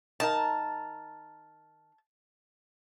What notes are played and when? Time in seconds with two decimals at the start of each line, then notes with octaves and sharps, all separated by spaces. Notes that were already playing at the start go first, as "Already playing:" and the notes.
0.20 D#3 A#4 A5